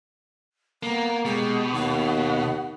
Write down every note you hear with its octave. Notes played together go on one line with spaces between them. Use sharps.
A#3 B3
B2 G#3 G4
D#2 F#5